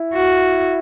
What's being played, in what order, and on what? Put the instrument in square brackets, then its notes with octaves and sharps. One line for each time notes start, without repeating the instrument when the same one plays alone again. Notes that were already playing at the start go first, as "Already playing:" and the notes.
Already playing: [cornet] E4
[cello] F#4